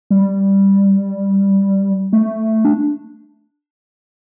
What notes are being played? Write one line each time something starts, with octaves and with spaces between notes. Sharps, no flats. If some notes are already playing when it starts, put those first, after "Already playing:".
G3
A3
D4